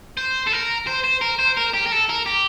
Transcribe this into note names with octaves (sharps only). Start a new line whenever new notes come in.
C5
A4
A#4
C5
C5
A#4
C5
A#4
G4
A#4
A4
A#4
G4